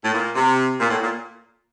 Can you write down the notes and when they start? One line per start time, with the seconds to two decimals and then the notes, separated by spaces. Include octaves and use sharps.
0.03 A2
0.14 A#2
0.35 C3
0.79 A#2
0.90 A2
1.02 A#2